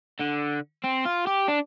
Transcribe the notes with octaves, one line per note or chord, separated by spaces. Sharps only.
D3
C4
F4
G4
D4